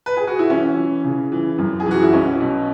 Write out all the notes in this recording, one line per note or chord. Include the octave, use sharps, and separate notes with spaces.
B4
G#4
F#4
E4
E3 C#4
E3
C#3
E3
F#2
G#4
E3 F#4
E4
B1 C#4
B2